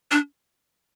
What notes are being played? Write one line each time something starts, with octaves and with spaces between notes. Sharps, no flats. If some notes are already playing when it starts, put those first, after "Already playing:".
D4